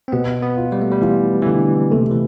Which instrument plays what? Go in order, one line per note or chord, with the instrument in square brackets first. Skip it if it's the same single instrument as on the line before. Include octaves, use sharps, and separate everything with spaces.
[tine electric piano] C4
[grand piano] B2 [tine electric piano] B3
[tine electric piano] B3
[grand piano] F4
[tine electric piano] G3
A3
G3
[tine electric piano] E3 [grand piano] F4
[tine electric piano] E3
[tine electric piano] D3 [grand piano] F4
[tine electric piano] C3 [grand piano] A3
[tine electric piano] E3